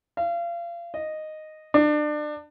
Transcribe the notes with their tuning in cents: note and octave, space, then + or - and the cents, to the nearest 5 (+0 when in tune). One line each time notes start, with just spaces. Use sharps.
F5 -30
D#5 -5
D4 +30